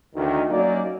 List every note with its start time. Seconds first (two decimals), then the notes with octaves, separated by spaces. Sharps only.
0.16 D2 D#3
0.51 F#3 A#3 C#4 D#4 D5